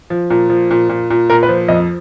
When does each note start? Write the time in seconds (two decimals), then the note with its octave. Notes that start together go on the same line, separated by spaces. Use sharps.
0.10 F3
0.30 A#2
0.50 F3
0.71 A#2
0.89 A#2
1.10 A#2
1.30 A#2 A#4
1.43 B4
1.49 F3 C5
1.68 F2 D#5